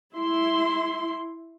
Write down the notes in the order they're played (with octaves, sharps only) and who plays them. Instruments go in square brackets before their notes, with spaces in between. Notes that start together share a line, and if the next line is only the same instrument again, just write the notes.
[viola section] E4 C6